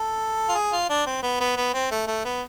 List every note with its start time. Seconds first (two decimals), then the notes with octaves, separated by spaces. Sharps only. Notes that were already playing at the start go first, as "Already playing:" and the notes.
Already playing: A4
0.49 F4
0.55 G#4
0.72 F4
0.89 D4
1.06 C4
1.23 B3
1.40 B3
1.57 B3
1.74 C4
1.91 A3
2.07 A3
2.25 B3